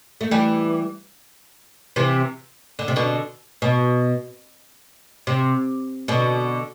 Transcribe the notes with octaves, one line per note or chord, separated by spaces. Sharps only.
A3
E3 G3
C3 E3
D3
C3
B2 D3
B2
C3
B2 D3